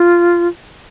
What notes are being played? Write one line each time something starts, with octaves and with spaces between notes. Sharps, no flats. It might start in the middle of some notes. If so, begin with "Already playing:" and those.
Already playing: F4